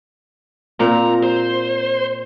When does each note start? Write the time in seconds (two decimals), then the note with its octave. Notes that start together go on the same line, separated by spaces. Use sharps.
0.80 A#2 C4 A#5
1.23 C5